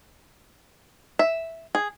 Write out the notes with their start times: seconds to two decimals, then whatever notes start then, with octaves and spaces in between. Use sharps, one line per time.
1.19 E5
1.75 G#4